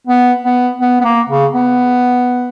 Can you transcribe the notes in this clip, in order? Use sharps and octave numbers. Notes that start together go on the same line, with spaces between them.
B3
B3
B3
B3
A#3
C#3
B3